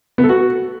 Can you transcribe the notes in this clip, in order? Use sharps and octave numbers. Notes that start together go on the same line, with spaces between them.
B3
A4
F#4